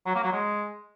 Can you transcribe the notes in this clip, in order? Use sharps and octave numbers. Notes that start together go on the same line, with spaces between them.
F#3
A#3
F#3
G#3